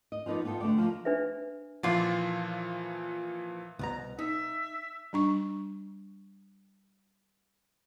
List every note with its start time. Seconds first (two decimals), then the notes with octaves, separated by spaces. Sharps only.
0.12 D#5
0.26 F3 B3 D#4 B4 D5
0.45 B3 F4 A4 G5
0.60 D3 A3 D5
0.78 F3 A#3
1.05 D4 B4 E5
1.83 A#2 E3 F3 F4 D5
3.79 C2 B2 A#5
4.19 D#4 E5
5.13 G3 D4 C#6